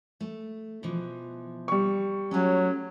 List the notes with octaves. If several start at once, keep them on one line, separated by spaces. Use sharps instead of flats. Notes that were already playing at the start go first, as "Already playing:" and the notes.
A3
B2 E3 F3
G3 C#6
F#3 A3 C#4